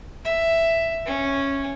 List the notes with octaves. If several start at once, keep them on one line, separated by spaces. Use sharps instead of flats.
E5
C#4